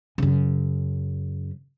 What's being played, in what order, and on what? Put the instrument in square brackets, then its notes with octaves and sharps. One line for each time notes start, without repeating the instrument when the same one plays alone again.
[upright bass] F#2 C#3